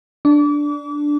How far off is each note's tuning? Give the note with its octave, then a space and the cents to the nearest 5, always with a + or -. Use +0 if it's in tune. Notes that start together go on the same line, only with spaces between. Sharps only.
D4 +0 D6 -35